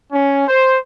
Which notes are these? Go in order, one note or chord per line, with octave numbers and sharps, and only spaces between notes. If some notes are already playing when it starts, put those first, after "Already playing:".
C#4
C5